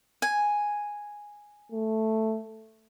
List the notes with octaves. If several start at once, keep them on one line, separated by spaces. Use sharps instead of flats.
G#5
A3